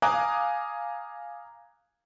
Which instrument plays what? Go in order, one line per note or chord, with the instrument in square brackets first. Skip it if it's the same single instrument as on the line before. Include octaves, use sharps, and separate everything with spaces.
[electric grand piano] F5 G#5 A#5 D6 D#6 F#6